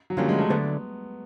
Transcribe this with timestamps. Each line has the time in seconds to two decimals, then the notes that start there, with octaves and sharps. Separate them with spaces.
0.10 F#3
0.17 D3 F3 G3 A#3 C#4 F4
0.29 G#3
0.39 A3
0.50 D3 F#3 A3 B3 D4